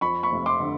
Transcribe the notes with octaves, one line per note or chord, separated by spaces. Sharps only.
F2 B5 C#6
B5 C#6
F1
C6 D6
D3